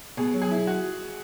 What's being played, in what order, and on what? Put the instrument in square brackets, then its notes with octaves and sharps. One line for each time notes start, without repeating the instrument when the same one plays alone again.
[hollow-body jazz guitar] B2 [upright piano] G#4
[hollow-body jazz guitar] F#3
[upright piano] G#4
[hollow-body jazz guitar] E4
[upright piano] F#4